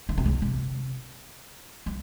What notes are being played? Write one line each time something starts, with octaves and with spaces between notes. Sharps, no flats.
D3
C3
C#3
C3
G3